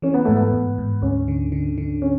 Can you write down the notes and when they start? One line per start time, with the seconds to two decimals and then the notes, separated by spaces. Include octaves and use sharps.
0.02 E3 C#4
0.14 B3
0.25 G#2 A3
0.36 B3
0.53 G#2
0.78 G#2
1.02 D2 C#4
1.28 D3
1.52 D3
1.78 D3
2.02 C#4